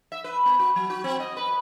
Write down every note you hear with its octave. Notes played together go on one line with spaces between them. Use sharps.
E5
B4
B3
F#4
F#3
F#4
C4
D#5
B4